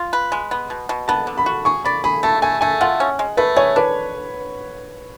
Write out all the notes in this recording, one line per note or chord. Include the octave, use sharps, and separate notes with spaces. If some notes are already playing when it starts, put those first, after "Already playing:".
Already playing: F4
B4
G#3
B3
B2
B2
B3 A5
D3
B5
F#4
G#4 C#6
D5 B5
G#4 B5
A3 A5
A3 G#5
A3 G#5
F4 F#5
C#4
G#3
A3 B4
G#4 C#5
D4 B4